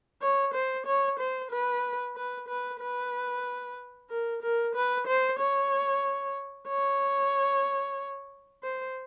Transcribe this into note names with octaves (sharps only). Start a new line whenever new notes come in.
C#5
C5
C#5
C5
B4
B4
B4
B4
A#4
A#4
B4
C5
C#5
C#5
C5